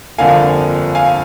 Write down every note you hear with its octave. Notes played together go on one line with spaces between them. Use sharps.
G1 F2 D3 F3 A#3 F5 G#5
F5 G#5